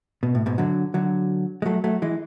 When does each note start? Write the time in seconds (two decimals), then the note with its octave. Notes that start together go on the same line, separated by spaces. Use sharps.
0.23 B2
0.35 A2
0.46 G#2 B2
0.58 D3 F#3
0.94 D3 F#3
1.62 G#3
1.66 F#3 A3
1.84 F#3 A3
2.02 E3 G#3